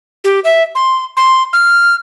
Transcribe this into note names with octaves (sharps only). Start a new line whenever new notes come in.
G4
E5
C6
C6
F6